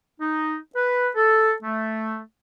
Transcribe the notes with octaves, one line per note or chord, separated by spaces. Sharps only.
D#4
B4
A4
A3